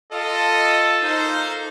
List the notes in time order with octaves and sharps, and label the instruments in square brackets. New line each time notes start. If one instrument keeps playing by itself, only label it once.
[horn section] F4 D#5 [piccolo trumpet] A4
[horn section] A#3 D#4 C5